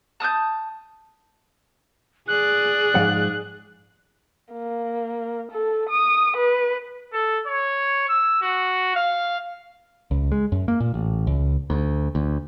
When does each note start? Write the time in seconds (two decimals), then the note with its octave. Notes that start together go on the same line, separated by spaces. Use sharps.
0.20 A5 D#6 F6 G6
2.28 G#4 D5 F#6
2.95 G#2 F3 F#5
4.53 A#3
5.52 A4
5.89 D#6
6.37 B4
7.13 A4
7.47 C#5
8.09 E6
8.42 F#4
8.96 F5
10.11 C#2
10.32 G#3
10.52 F#2
10.68 A#3
10.80 A#2
10.94 A1
11.27 C#2
11.70 D2
12.15 D2